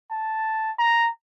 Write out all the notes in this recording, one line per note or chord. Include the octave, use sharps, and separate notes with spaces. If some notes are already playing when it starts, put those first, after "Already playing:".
A5
A#5